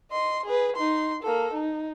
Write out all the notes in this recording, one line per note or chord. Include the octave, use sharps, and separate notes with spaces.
D#5 C6
G#4 B4
D#4 C6
A#3 A4
D#4